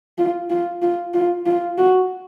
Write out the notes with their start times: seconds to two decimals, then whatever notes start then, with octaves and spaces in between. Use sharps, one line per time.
0.18 F4
0.50 F4
0.82 F4
1.14 F4
1.46 F4
1.78 F#4